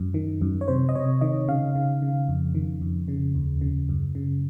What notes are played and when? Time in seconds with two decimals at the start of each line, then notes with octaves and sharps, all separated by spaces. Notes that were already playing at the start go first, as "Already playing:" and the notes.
Already playing: F#2
0.14 D#3
0.41 F#2
0.61 C#5
0.68 C3 C5
0.89 D#5
0.95 C3 C#5
1.21 D#3 D#5
1.48 C#3 F5
1.76 C#3
2.02 C#3
2.29 F2
2.55 D#3
2.81 F2
3.08 C#3
3.35 D#2
3.61 C#3
3.89 F#2
4.15 C#3